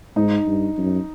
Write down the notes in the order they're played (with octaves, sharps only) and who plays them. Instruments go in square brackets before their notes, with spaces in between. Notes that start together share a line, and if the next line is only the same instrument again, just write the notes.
[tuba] G#2 [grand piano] D#4
[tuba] G2
F#2